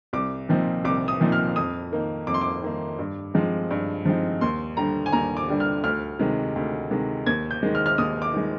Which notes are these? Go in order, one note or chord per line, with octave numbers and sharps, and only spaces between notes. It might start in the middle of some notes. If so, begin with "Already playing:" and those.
C2 D6
A#2 F3 C4 D#4
C2 D6
D#6
A#2 F3 C4 D#4
F6
F2 D#6
D#3 A#3 D#4
F2 D6
C6
D6
D#3 A#3 D#4
G2
F3 G#3 C4 D#4
G2
F3 G#3 C4 D#4
D#2 C6
D3 G3 D4 A#5
G#5
D#2 A#5
D6
D3 G3 D4
F6
D2 F6
C3 D#3 G#3
D2
C3 D#3 G#3
D#2 G#6
G6
D#3 G#3
F6
F6
D#2 D#6
D6
D#3 G#3